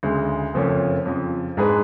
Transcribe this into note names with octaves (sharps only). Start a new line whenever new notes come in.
D2 C#3 G#3
F#1 F2 F3 A3 C#4
F2 C#3 F3
G#2 G#3 D4 G#4 B4